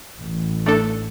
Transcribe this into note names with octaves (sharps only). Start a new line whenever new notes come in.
A1
A3 D4 A4